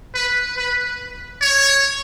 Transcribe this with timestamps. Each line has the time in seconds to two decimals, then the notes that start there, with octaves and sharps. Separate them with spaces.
0.14 B4
0.57 B4
1.41 C#5